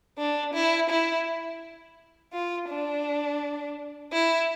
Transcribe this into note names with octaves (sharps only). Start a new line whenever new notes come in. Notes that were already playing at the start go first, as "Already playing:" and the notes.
D4
E4
E4
F4
D4
E4